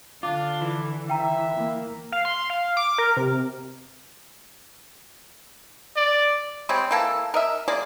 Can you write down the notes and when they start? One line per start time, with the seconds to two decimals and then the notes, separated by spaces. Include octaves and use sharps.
0.23 D3 D4 F4 D6
0.61 E3
1.10 E5 G5 A#5
1.54 A#3
2.12 F5
2.25 C6
2.50 F5
2.77 D6
2.98 A#4
3.17 C3
5.96 D5
6.69 G3 G#3 C4 C#5
6.91 E3 A#3 A4
7.34 A#4 D#5 E5
7.68 G#3 A#3 G#4 D5